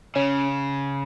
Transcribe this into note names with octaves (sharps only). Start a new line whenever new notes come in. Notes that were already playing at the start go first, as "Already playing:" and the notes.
C#3 C#4